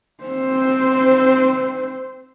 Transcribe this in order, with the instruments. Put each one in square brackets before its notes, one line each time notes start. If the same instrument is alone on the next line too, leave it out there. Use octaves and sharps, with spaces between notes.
[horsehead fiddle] C4 C5